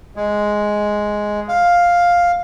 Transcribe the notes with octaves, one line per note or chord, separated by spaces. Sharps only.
G#3
F5